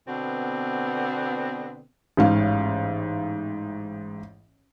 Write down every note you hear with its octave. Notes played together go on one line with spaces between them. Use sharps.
B2 D3 B3 C4
A1 G#2 F5